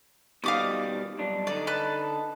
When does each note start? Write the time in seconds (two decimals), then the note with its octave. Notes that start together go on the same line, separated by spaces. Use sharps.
0.44 B2 D#3 G3 F5 D6 D#6
1.19 B1 G2 D4
1.47 D3 D#4 D5
1.67 B4 A5